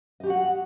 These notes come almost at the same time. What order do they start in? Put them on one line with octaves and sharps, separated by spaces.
D#5 G4 F#4 F#5